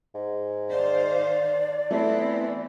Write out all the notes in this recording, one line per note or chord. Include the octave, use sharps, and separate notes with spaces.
G#2
D#3 C5 D5 F5
E3 A3 B3 C4 E4